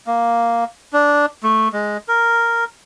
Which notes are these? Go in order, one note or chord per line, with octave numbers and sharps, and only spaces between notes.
A#3
D4
A3
G#3
A#4